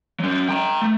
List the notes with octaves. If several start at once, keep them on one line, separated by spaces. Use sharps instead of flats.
F#3 C#4
G5 A#5
A3